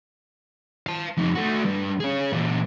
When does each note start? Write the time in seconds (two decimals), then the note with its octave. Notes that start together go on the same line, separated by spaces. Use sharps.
0.87 F5 A5
1.17 F2 D#4
1.35 A3 F#4
1.65 G2
2.00 C#4 G#4
2.33 A#2 E3